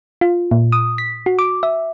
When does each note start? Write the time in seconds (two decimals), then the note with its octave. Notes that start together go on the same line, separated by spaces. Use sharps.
0.21 F4
0.51 A#2
0.72 D#6
0.98 B6
1.26 F#4
1.39 D6
1.63 E5